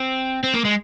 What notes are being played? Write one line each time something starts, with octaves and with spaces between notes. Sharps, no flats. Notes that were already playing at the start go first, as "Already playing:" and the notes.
Already playing: C4
C4
A#3
G#3